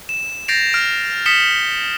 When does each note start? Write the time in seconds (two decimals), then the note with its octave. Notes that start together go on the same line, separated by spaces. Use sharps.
0.09 E7
0.48 G6 A6 A#6 C7 D7 F7
0.73 F6 D7
1.26 D#6 B6 C#7 E7 G7